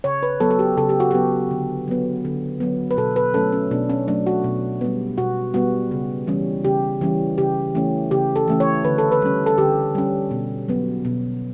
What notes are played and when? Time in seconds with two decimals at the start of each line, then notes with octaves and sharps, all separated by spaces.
0.04 C#3 C#5
0.23 B4
0.40 F#3 B3 A4
0.51 A4
0.59 G4
0.77 C#3 A4
0.89 G4
1.00 F#4
1.11 F#3 B3 G4
1.51 D3
1.88 F#3 B3
2.25 D3
2.60 F#3 B3
2.91 B4
2.97 B2 A4
3.16 B4
3.34 F#3 A3 C#4 A4
3.52 C#4
3.71 B2 D4
3.89 C#4
4.08 F#3 A3 C#4 D4
4.27 F#4
4.44 B2
4.81 G3 B3
5.18 B2 F#4
5.54 G3 B3 F#4
5.91 C#3
6.27 E3 G3 C#4
6.64 C#3 G4
7.01 E3 G3 C#4
7.38 C#3 G4
7.75 E3 A3 C#4
8.11 C#3 G4
8.36 A4
8.48 E3 A3 C#4
8.60 C#5
8.84 D3 B4
8.98 A4
9.12 B4
9.22 G3 C#4
9.46 A4
9.58 D3 G4
9.95 G3 C#4
10.31 B2
10.68 F#3 B3
11.05 B2